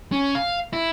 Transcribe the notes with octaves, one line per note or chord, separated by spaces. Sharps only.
C#4
F5
E4